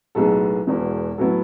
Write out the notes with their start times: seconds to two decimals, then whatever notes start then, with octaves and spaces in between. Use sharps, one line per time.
0.15 B1 A2 G#3 B3 A4
0.67 E1 E2 B2
1.18 A2 F#3 B3 E4 A4